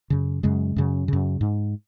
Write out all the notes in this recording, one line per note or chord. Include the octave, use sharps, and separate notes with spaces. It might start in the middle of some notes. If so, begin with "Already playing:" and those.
F#2 C#3
F#2 C#3 G#3
F#2 C#3
F#2 C#3
G#2